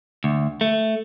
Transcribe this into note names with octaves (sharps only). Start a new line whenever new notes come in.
D2
A3